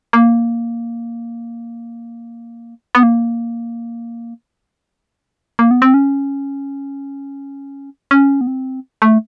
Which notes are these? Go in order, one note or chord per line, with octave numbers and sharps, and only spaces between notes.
A#3
B3
A#3
A#3
B3
C4
C#4
C#4
B3
C4
A3